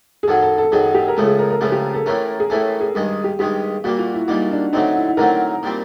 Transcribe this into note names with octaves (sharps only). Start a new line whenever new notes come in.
G#4
F#2 D#3 F#3 A4
A4
A4
F#2 D#3 F#3 G#4
G4
A#4
C#2 C#3 F3 A3 A4
G#4
A#4
A#4
C#2 C#3 F3 A3 G#4
G4
A4
A2 E3 A3 C#4 A#4
G#4
A2 E3 A3 C#4 A4
G#4
G2 D#3 G#3 G#4
G4
G2 D#3 G#3 G4
A#2 G3 A#3 F#4
F4
E4
A#2 G3 A#3 D#4
D4
D3 F#3 A3 C4 D#4
E4
E4
D3 F#3 A3 C4 A#4
A#2 G3 C4